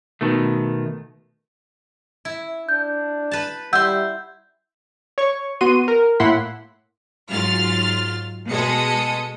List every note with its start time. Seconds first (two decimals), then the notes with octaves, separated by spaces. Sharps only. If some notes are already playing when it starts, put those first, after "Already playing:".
0.21 B2 D#3 A3
2.25 E4
2.69 D4 G6
3.31 B4 A5
3.73 G3 E4 F#5 C6 E6 G6
5.18 C#5 C#6
5.61 B3 F#4 C6 D#7
5.88 A#4
6.20 A2 A#3 E4 F#5 C6 B6
7.30 G#2 F#3 F4 F6 A6
8.51 B2 G#3 A4 D#6 C#7